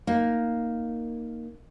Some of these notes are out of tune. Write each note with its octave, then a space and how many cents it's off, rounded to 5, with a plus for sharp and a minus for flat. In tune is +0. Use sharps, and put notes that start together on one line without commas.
A#3 +0 D#4 +0